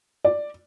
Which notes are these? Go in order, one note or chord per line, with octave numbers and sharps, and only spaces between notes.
D5